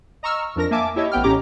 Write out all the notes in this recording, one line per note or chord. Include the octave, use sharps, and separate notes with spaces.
D#5 A#5 C#6 E6 F6
F2 D4 A#4 A#6
A#3 E5 G#5 A5 D6
E4 G4 C#5 D#5 E5
A1 B3 G5 F6
A1 A2 C#4 G4 A#5 D6